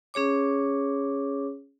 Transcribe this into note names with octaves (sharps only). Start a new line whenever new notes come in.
C#4 G#4 C#5 D6